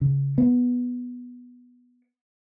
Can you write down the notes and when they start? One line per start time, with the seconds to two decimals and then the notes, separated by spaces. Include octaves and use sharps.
0.01 C#3
0.38 B3